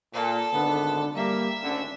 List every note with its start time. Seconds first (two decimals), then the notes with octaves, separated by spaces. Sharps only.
0.13 A#2 A4
0.53 G#1 D3 B3
1.14 G3 A#3 E5 E6
1.63 G#1 D2 D3 C#4